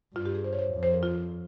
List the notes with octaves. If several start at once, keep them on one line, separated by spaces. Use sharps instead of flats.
G2 F4
G4
G#4
C5
C#5
C5
F2
C5
A#4
F4